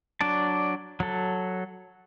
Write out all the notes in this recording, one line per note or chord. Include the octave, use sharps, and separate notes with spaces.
F#3 D4 D5 A5
F#3 A4